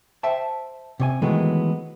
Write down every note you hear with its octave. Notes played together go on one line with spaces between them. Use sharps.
C5 E5 G5 A5
C3 C#5 G#5
D#3 E3 F#3 G#3 A3 B3